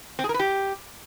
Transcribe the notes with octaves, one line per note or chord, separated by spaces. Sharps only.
C4
G#4
A#4
B4
G4